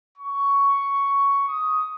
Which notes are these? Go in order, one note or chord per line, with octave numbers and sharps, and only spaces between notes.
C#6
D#6